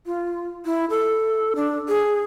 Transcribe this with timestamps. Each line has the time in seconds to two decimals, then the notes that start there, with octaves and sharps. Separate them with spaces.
0.06 F4
0.65 E4
0.90 A4
1.56 D4
1.88 G#4